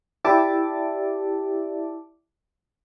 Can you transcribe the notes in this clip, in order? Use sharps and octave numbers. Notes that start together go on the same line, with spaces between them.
E4 G4 D5 E5 A5 D6